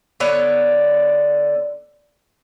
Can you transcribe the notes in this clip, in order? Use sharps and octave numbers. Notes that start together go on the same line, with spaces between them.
D3 B3 C#5